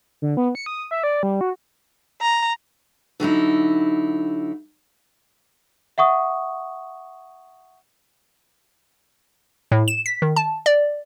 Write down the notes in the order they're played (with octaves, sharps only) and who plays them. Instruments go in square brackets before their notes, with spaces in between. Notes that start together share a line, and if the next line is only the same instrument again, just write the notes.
[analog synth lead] D3
B3
C#7
D#6
E5
D5
G3
F#4
[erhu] A#5
[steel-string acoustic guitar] D3 F#3 D#4 E4
[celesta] E5 F#5 C#6 D#6
[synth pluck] A2
E7
B6
D#3
A5
D5